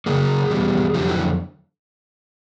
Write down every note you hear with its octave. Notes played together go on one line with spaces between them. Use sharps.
C#3 F#3 A#3 F#4 G#4
E2 B2 G3
F2 D3 F#3 F4 G4
E4 F#4